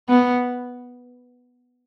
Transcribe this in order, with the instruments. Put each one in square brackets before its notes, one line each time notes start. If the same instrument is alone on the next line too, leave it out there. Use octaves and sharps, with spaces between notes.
[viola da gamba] B3